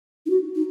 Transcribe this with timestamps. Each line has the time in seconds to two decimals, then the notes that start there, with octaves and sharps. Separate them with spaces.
0.26 D#4
0.30 F#4
0.55 D#4